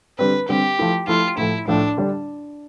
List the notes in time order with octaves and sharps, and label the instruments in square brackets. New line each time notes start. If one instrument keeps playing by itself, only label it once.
[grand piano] D3 G3 C4 [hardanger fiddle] B4
[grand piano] D3 G3 C4 [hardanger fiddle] G4
[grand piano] F3 A3 E4
[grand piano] F3 A3 E4 [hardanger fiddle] F4
[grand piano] A2 F3 A3 [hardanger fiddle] E4
[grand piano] A2 F3 A3 [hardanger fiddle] D4
[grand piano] D3 G3 D4